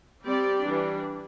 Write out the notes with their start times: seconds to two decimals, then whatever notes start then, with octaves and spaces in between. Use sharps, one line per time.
0.24 G3 C4 G4 D5
0.62 E3 G3 D4